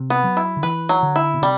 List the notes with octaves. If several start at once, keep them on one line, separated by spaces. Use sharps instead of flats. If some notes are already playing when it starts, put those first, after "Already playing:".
Already playing: C3
B3
F#3
E4
D3
E3 B4
F#3
D3
E4
B2
C3 G3